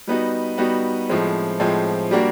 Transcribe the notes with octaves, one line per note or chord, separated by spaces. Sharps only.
G3 B3 D#4 F#4
G3 B3 D#4 F#4
A2 F3 G#3 C4
A2 F3 G#3 C4
G3 A#3 D4 F#4